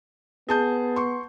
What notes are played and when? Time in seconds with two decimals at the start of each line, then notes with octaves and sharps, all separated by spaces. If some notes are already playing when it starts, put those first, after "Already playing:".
0.49 B3 G#4 A5 G6
0.96 C6 C#6